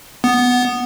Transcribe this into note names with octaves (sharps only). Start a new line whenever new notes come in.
B3